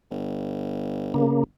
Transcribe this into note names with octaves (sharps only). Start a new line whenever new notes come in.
G1
C#3 A#3